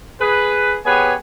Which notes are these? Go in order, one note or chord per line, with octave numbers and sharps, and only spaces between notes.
G#4 B4
B3 G4 G#4 B4 C#5 G#5